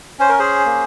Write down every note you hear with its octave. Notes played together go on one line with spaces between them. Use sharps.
C#4 C5
A#4
G#4 C5
A#3